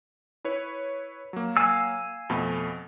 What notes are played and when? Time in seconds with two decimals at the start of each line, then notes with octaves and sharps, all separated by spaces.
0.44 E4 B4 C#5
1.33 F#3 A#3
1.57 F5 G#5 E6
2.30 F2 B2 A3